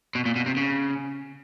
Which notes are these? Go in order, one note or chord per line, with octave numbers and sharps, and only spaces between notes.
B2
A#2
B2
C3
C#3